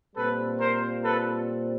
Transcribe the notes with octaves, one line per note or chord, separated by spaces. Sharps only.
A#2 G3 C4 F4 A4 B4
A#4 C5
A4 B4